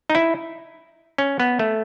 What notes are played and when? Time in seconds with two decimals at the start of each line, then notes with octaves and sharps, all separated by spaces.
0.10 D#4
0.15 E4
1.18 C#4
1.40 B3
1.59 A3